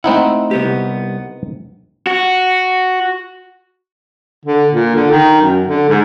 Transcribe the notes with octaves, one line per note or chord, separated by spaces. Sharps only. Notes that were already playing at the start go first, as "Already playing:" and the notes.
A3 C4 D#4 E4 F#5
C2 B3 G4
F#4
D3
A#2
D3
D#3
F#2
D3
G#2